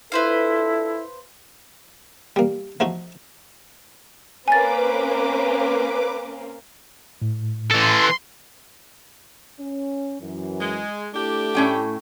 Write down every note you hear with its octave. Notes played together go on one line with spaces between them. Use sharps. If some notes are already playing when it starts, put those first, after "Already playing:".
D4 E4 F4 A4 B4 C5 F5
G3 A#3
F3 A3 D#4 F#4
A#3 C4 C#4 B4 G#5 D6 A6
A2
E3 A4 C6
C#4
F#2 E3
G#3
A3 D4 E4 G4
A2 C#4 G5